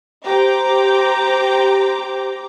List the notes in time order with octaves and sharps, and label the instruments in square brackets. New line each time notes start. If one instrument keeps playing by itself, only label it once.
[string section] G4 C5 G5 A#5 D6